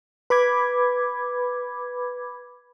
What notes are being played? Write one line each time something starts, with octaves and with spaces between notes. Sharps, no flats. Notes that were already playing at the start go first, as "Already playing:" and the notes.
B4 B5 D6 G#6